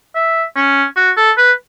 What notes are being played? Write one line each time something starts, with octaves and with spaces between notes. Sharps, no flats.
E5
C#4
F#4
A4
B4